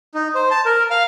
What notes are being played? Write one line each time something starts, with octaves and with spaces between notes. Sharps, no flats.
D#4
C5
A5
A#4
F5